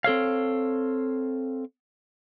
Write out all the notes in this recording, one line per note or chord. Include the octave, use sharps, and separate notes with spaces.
C4 A4 C#5 F5